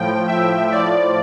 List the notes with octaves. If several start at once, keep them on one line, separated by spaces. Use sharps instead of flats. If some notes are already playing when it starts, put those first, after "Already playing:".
Already playing: A2 F3 G5
E5
A2 F3 D5